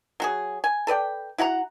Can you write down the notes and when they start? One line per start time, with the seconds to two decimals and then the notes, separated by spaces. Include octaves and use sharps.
0.20 F#3 F#4 G#4
0.64 G#5
0.87 A4 B4 D5 G5
1.38 E4 F#4 F#5 A#5